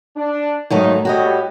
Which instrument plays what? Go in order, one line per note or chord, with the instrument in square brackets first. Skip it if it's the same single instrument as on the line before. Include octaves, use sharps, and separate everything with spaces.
[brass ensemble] D4
[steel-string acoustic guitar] G#2 F#3 A3 [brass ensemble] D3 D#3 D#4
[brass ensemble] A2 G3 C#5 [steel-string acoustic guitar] F#4 G4 D#5